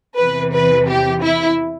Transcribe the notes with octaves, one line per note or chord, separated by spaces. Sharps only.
E2 C3 E3 B4
B4
G4
E4